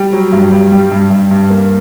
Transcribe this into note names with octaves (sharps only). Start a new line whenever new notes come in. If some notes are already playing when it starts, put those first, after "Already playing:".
Already playing: G3
F#3
G2
G3
G3
G2
G2
G2
A#3